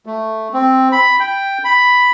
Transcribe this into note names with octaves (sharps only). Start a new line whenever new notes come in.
A3
C4
B5
G5
B5